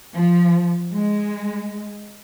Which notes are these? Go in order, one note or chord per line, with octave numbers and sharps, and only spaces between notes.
F3
G#3